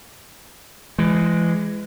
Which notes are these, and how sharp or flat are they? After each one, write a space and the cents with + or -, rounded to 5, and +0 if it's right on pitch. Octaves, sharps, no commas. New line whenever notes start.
E3 +30 G#3 +0